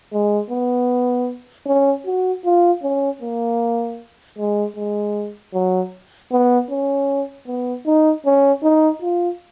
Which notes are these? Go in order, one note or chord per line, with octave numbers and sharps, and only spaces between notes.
G#3
B3
C#4
F#4
F4
C#4
A#3
G#3
G#3
F#3
B3
C#4
B3
D#4
C#4
D#4
F4